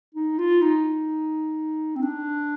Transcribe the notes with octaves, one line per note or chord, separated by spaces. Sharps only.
D#4
F4
D#4
C4
D4